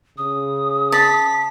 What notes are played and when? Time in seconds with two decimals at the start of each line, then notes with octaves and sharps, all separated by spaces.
0.18 C#3 D#6
0.92 A5 B6